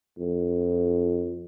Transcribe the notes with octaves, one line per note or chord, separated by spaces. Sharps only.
F2